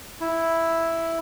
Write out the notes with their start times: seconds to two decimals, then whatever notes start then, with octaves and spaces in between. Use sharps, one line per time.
0.21 E4